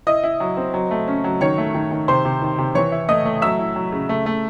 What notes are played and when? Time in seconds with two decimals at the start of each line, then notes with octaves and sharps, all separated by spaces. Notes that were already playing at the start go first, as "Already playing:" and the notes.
0.07 E4 D#5 D#6
0.23 E4
0.40 F#3
0.57 C4
0.74 F#3
0.91 A3
1.08 C#4
1.24 F#3
1.41 D#3 C#5 C#6
1.58 A3
1.74 D#3
1.91 D#3
2.08 C3 C5 C6
2.25 C3
2.42 D#3
2.58 C3
2.75 E3 C#5 C#6
2.92 E4
3.08 A3 D#5 D#6
3.25 A3
3.42 F#3 E5 E6
3.59 E4
3.76 F#3
3.92 C#3
4.09 A3
4.26 A3